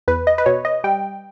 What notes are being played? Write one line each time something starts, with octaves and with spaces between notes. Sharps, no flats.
E2 B4
D#5
B4
B2 C#5
D#5
G3 G5